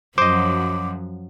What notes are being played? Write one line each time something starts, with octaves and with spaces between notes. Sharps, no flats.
F#2 F3 F#3 C5 D#5 D6